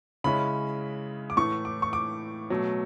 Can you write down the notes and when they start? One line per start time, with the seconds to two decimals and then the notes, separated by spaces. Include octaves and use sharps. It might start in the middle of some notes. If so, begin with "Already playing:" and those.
0.24 C#3 G#3 C#4 E4 B5
1.30 D6
1.37 A2 E3 A3 C#6
1.65 D6
1.82 C#6
1.93 D6
2.50 B2 F#3 A3